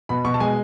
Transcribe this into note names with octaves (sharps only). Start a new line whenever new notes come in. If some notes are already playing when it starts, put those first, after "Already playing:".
B2 B5
B2 C#6
A5
G#3 G#5